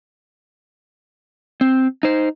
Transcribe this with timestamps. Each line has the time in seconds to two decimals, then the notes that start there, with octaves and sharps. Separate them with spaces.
1.61 C4
2.03 D#4 C5